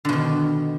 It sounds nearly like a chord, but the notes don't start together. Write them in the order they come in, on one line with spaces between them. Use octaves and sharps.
D3 B2 D#3